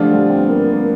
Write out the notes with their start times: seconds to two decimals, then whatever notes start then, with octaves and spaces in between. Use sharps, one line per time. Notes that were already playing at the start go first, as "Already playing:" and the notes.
Already playing: D3 F3 G3 A3 D4 F4
0.13 G3
0.30 C4
0.37 B3
0.49 A#3
0.61 B3
0.73 A#3